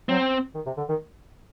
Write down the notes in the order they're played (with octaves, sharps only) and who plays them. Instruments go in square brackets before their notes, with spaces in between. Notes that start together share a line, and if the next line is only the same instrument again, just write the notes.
[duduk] F#3 [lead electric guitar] C4
[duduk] D#3
C3
D3
D#3